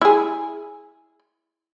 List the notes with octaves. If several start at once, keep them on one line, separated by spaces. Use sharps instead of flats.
E4 G#4